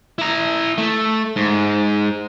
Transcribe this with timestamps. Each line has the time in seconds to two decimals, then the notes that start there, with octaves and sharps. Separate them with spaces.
0.18 E4 A#5
0.78 A3
1.36 G#2